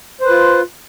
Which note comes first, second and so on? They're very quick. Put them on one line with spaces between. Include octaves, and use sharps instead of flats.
C5 B4 F4